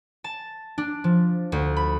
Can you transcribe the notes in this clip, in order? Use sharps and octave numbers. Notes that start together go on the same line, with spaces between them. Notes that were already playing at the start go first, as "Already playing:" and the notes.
A5
D4
F3
D2
B5